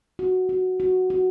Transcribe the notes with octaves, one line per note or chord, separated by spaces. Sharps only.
F#4
F#4
F#4
F#4